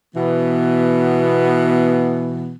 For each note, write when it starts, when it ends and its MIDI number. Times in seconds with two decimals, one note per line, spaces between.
0.14 2.53 47
0.14 2.53 52
0.14 2.53 59